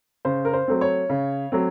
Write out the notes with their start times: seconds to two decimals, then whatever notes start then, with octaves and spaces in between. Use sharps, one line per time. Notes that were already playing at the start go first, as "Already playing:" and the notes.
0.25 C#3 C5
0.45 A#4
0.53 C5
0.68 F#3 A3 C4
0.81 C#5
1.10 C#3
1.52 F#3 A3 C4